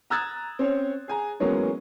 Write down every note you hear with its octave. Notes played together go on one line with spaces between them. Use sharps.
A#5 D#6 E6 F#6 G#6 A6
C4 C#4 C#5
G#4 G#5 A#5
E3 F#3 G#3 A#3 B3 C#4